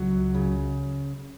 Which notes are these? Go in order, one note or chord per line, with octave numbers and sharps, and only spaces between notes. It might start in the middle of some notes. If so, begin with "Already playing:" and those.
Already playing: C#2 F#3
C#3